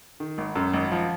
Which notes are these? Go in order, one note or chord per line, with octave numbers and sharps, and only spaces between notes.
D#3
G#1
F#2
G#1
F3